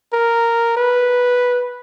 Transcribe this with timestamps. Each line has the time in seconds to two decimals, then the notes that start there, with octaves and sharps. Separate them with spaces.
0.13 A#4
0.77 B4